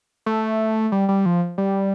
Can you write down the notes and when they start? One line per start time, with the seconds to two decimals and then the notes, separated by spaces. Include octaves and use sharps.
0.26 A3
0.92 G3
1.09 G3
1.26 F3
1.58 G3